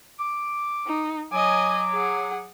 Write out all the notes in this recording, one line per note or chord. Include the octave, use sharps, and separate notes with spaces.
D6
D#4
F#3 D#5 G#5 D6
G#4 F#5